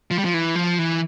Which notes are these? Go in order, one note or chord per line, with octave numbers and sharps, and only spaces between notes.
F3
G3
F3
E3
F3
E3